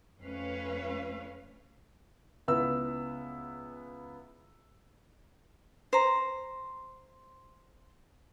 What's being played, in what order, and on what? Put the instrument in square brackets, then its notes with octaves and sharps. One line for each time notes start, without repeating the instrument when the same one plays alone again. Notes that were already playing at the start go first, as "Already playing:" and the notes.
[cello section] F2 A3 C#4 B4 F5
[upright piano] C#2 B3 E4 E6
[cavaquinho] C5 A#5